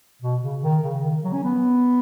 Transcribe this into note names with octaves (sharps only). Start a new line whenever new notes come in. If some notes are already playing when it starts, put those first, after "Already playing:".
B2
C#3
D#3
C#3
D#3
F#3
C#4
B3